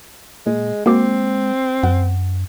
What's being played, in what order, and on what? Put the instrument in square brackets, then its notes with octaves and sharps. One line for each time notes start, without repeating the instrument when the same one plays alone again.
[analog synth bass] A#2 [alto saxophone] G#3
[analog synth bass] G#3 [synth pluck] A#3 F#4 D6 [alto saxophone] C4
[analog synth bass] F#2 [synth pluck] F#5